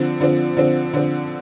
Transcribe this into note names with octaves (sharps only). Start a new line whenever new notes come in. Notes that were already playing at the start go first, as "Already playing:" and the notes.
Already playing: D3 F3 C4
D3 F3 C4
D3 F3 C4
D3 F3 C4